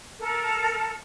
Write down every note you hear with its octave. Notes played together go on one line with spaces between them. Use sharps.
A4 A#4